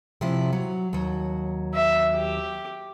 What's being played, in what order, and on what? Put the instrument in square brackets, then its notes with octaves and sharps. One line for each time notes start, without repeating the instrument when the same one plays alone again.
[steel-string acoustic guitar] C3 F3 E4
F#3
D#2 F#3
[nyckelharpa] E5
G4